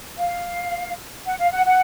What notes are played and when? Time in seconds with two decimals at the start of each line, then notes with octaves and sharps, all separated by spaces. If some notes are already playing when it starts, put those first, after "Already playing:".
0.16 F5
1.25 F#5
1.38 F5
1.52 F#5
1.65 F#5